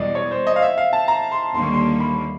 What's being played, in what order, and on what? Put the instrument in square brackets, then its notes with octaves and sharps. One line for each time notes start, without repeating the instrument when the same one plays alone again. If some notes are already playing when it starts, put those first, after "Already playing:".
Already playing: [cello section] E2 B2 G3 [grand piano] D5 D#5
[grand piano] C#5
C5
D#5
F5
E5
F5
A5
A#5
C6
[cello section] D#2 D3 G3 A#3 [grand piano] C6
[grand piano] C#6
C6
B5